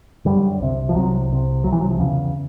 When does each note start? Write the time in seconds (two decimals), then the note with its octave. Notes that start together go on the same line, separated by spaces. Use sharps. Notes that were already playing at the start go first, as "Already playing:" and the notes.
0.25 F#2 D3 G3
0.60 C2 C3
0.89 F3
0.95 C2 C3 F#3
1.30 C2 C3
1.64 C2 C3 F#3
1.72 E3
1.81 F#3
1.90 F3
1.99 E2 C#3